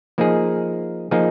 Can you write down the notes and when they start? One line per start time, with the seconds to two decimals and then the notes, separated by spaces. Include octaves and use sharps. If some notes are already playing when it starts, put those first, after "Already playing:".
0.18 F3 A#3 D#4 G#4
1.11 F3 A#3 D#4 G#4